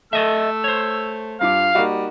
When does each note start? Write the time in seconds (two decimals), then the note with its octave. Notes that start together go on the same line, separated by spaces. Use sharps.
0.13 A3 A4 D#5 E5 E6
0.64 C5 C#5
1.41 G2 F4 F5 D6
1.75 G3 A#3 D#4 F#4